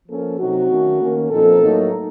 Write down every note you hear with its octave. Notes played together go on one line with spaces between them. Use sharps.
F3 A#3 C#4 A4
C3 F#3 C4 D#4 F#4
D#3 A3 C#4
D#3 A#3 C#4
A#2 F3 C4 D#4 A4
A2 F#3 A#3 D#4